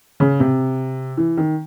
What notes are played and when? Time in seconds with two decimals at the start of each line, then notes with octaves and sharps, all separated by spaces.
0.20 C#3
0.40 C3
1.17 E3
1.37 D#3